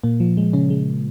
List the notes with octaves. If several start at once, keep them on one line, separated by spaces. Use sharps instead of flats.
A#2 A#3
F3
G#3
C#3 C#4
G#3